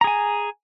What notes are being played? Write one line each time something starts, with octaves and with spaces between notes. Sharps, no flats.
G#4 G#5 A#5